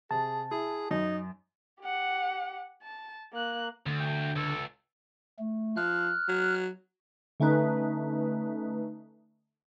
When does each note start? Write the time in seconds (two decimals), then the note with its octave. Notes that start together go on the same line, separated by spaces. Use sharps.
0.11 C3 G#4 A5
0.51 E4 G#4
0.91 F#2 D#4
1.82 G4 F#5
2.82 A5
3.33 A#3 F#6
3.87 D2 D3
4.00 G5
4.36 C#2 A4
5.39 A3
5.76 F3 F6 F#6
6.28 F#3
7.40 D3 A3 C#4 D#4 B4